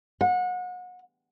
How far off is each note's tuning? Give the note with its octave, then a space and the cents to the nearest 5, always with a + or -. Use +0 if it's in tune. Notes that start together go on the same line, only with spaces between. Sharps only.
F#5 -30